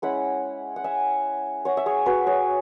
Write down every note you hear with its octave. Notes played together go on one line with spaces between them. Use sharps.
G#3 C#4 E4 F#5 B5
F#5
E5 G#5
C#5 F#5
E5
G#4 C#5
F#4 B4
G#4 C#5